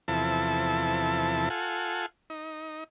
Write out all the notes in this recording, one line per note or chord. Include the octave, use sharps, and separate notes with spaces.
E2 C3 F3 E4 A4 A5
F4 A4 F#5 G#5
D#4